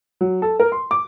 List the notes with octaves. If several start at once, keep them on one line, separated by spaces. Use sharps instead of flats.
F#3
A4
A#4
C6
D6